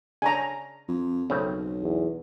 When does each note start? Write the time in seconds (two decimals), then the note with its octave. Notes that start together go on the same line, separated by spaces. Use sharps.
0.22 C#3 D4 C#5 G#5 A#5
0.88 F2
1.30 B1 C#3 A3 C4
1.82 E2